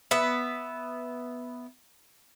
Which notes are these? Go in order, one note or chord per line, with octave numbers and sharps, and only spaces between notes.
B3 E5